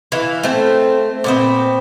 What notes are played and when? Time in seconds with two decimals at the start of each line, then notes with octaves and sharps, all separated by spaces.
0.12 E3 F5
0.43 A3 C4
1.24 A#2 B3 C4